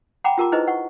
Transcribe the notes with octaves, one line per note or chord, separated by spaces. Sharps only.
F#5 G5 A#5 B5 D6
F4 G4 A#4 A5 A#5 D6
D#4 E4 G#4 B4 C5 D#5
F#5 C#6